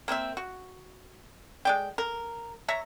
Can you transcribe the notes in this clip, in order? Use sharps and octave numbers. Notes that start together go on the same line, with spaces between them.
A#3 C4 D#5 E5
F#4
G#3 D5 G5
A#4
C#5 E5 A#5